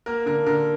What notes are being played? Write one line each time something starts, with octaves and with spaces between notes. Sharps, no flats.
A#3 A#4
D3 A#4
D3 A#4